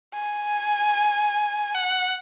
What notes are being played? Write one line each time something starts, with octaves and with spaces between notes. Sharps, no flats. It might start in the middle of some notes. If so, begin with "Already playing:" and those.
G#5
F#5